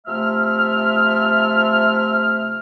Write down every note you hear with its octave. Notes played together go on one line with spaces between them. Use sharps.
C3 F3 A3 E5 F6